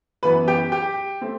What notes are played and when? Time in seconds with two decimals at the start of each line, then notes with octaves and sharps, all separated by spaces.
0.23 F#2 E3 B3 B4 B5
0.48 G4 G5
0.72 G4 G5
1.21 A3 C4